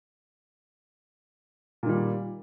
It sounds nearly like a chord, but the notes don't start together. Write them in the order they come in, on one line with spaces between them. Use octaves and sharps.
A#2 D#3 G3